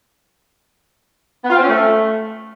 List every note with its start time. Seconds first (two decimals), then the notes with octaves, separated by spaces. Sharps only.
1.44 B3
1.50 F4
1.56 C4
1.62 C#4
1.69 A3